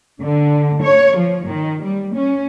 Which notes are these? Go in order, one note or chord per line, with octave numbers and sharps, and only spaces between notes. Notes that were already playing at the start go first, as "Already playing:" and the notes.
D3
C#5
F3
D#3
G3
C#4